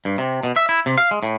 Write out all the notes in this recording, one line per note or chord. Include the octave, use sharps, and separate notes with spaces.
G2
C3
B2
E5
E4
C3
F5
G#3
A2